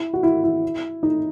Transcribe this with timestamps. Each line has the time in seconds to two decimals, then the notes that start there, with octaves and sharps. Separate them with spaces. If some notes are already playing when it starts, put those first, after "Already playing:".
Already playing: E4
0.14 F#4
0.23 E4
0.44 E4
1.03 D#4